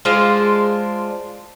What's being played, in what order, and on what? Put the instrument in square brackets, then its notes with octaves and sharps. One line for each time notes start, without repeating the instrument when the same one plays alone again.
[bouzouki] G#3 D4 F4 C5